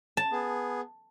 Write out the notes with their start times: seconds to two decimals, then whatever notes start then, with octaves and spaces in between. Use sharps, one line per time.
0.17 A5
0.32 B3 G#4